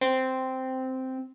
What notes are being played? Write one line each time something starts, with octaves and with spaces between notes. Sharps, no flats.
C4